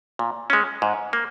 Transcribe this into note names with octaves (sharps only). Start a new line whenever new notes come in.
A#2
G#3 C#4
G#2
A#3